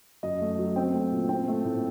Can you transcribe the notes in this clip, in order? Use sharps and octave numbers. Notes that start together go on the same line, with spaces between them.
F#2 D#5
A3
F#3
C4 G5
A3
A#2
C4 G5
A3
A2